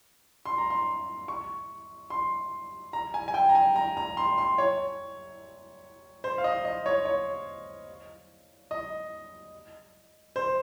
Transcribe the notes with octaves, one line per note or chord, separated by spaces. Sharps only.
C6
A#5
C6
C#6
C6
A#5
G#5
G#5
G5
A#5
G#5
A#5
A#5
C6
C6
C#5
C5
F5
D#5
D#5
C#5
C#5
D#5
C5